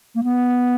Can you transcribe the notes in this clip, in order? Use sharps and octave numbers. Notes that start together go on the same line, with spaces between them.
A#3
B3